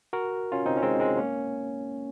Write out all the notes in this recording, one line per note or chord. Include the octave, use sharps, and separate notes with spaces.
F#4 A#4
C#4 F4
C4 D#4
C#4
G#3 C4
G#3 C4
A#3 C#4